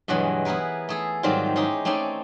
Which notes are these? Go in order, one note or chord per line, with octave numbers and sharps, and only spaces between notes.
G2 B2 E3 F#3 G#3
B3 E4 G#4 A#4 B4
A3 G#4 A4
G#2 D#3 F#3 G3 C4 F4
G#3 C#4 D#4 E4 G4
A3 C4 C#4 D#4 D5 G#5